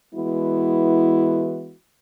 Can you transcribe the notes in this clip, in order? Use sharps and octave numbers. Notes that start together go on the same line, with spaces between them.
E3 G#3 B3 E4 F#4